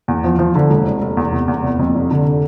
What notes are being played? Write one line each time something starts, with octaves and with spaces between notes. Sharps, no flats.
E2
F3
F3
D3
E1
F1
F1
E2
F1
E2
F1
F2
F1
D3